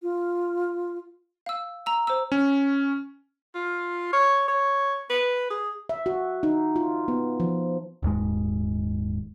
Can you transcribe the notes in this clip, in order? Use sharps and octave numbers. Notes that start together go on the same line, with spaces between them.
F4
F5 E6
A#5 E6
C5 E6
C#4
F4
C#5
C#5
B4
G#4
E5
F#4
D#4
F4
B3
F3
D#1 D#2 G#2 G#3